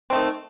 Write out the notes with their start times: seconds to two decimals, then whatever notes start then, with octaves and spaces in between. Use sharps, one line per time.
0.10 C4
0.13 A3
0.15 D#3